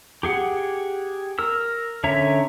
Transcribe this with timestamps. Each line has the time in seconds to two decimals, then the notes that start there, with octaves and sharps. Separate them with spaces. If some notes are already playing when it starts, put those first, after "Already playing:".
0.23 G4 G#4 F#5
1.39 A#4 E6
2.04 D3 C#4 C#5 E5 A#5